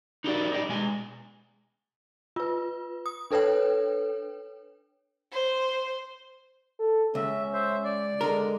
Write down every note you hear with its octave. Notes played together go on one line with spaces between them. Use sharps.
D#4 F#4 G4 A#4 C5 D5
D#4 G4 D5
B2 G#3 G#5
F4 B4
D#6
D4 A4 B4 C#5 G5
C5
A4
C#2 C#4 E5
C5 E5
D5
D3 G#3 A#4